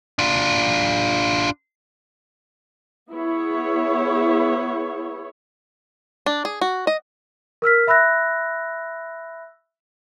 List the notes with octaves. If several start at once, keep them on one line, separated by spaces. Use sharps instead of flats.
D4 F4
B3 E4 G#4 C#5
D4
G#4
F#4
D#5
A#4 E6 F6 B6
E5 B5 E6 F#6 A#6